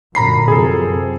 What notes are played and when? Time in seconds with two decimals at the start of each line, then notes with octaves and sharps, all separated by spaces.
0.15 F#2 A#2 D3 A#5 B5 C7
0.48 F#2 C3 F3 G#4 A4